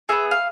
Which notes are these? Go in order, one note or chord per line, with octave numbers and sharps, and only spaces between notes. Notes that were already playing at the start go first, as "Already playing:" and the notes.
B3 D#4 G#4 E5
F5